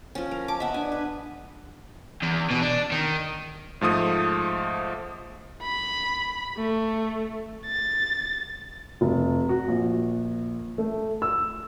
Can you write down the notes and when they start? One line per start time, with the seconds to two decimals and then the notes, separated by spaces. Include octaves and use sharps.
0.15 F3 C#4
0.31 A#4
0.48 A5 D6
0.60 B3 D#5 E5
0.74 D4 G#5
0.92 B4
2.23 E2
2.51 B2
2.62 D4
2.92 D#3
3.81 G#2 F3 A3 D#6
5.63 B5
6.58 A3
7.66 A6
9.01 F1
9.49 F#4
9.68 A#1
10.78 A3
11.22 E6